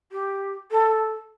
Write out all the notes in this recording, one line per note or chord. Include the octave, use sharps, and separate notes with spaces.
G4
A4